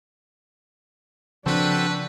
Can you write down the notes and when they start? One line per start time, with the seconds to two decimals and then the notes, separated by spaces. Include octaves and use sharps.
1.46 C#3 F3 C4 D4 F#4 A4 B4